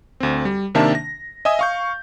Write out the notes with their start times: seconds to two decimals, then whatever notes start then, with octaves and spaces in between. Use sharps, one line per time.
0.20 D2 C4
0.45 G3
0.75 C3 D#3 A#3 D4 E5 A5
0.95 A#6
1.45 D#5 E5 G#5 D#6
1.59 F5 C#6 G6